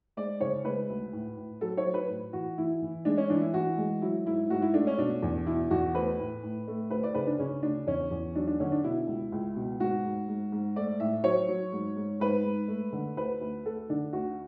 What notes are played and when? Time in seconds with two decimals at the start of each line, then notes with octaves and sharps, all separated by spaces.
0.17 G#3 D5
0.41 C#3 C#5
0.65 G#3 B4
0.90 D2
1.13 A2
1.37 A2
1.61 F#3 A4
1.77 C#5
1.86 F#3
1.94 B4
2.09 A2
2.33 E3 F#4
2.58 E3 E4
2.82 E3
3.05 G#3 D4
3.18 C#4
3.30 E3 D4
3.42 E4
3.54 E3 F#4
3.78 G#3
4.02 F#3 E4
4.26 G#2 E4
4.50 G#2 F#4
4.62 E4
4.74 A3 D4
4.87 C#4
4.98 B2 D4
5.22 E2
5.47 B2 E4
5.71 E2 F#4
5.94 A3 B4
6.19 A2
6.43 A2
6.68 A3
6.90 D2 B4
7.03 D5
7.15 C#3 B4
7.27 D4
7.39 C#3 C#4
7.63 D2 D4
7.87 E2 C#4
8.11 E2
8.35 F#3 D4
8.48 D4
8.60 D3 C#4
8.72 D4
8.84 B2 E4
9.07 C#2
9.32 C#2
9.56 B2
9.80 G#2 F#4
10.04 G#2
10.28 G#2
10.52 G#2
10.76 A3 D5
11.00 A2 E5
11.24 F#3 C#5
11.48 F#3
11.72 G#2
11.97 G#2
12.20 G#2 B4
12.45 G#2
12.68 A3
12.93 D3
13.17 D2 B4
13.41 D2
13.65 A3 A4
13.89 D3 D4
14.13 D2 F#4